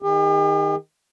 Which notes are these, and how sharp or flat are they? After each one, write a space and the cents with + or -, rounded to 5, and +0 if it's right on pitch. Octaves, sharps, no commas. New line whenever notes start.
D#3 +0 G4 +45